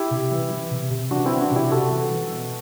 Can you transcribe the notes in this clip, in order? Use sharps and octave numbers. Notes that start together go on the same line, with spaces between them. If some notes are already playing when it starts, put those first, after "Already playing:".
Already playing: E4 G4
C3
E3
E3
C3
C3
E3 D4 F#4
C4 E4
E3
D4 F#4
C3 E4 G4
C3 F#4 A4
E3
E3
B2